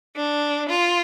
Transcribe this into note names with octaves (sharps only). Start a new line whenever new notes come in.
D4
F4